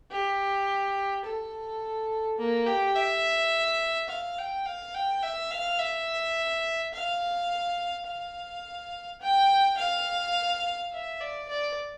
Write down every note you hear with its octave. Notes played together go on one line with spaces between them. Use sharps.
G4
A4
A#3
G4
E5
F5
G5
F5
G5
E5
F5
E5
F5
F5
G5
F5
E5
D5
D5